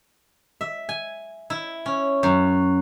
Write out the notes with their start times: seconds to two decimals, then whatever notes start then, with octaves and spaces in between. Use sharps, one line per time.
0.61 E5
0.89 G#5
1.50 E4
1.86 C#4
2.23 F#2